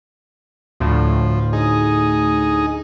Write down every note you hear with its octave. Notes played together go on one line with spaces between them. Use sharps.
D2 A2 F3
D#4 G#4